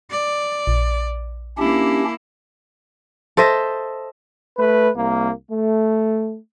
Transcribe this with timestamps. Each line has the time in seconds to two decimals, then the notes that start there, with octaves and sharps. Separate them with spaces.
0.10 D5
0.67 A#1
1.58 A#3 C#4 D4 E4 G4
3.37 A4 C5 D#5 E5
4.57 A3 B4
4.96 C2 A#3
5.50 A3